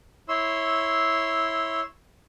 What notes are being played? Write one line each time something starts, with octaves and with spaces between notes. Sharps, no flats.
E4 C#5 C6 E6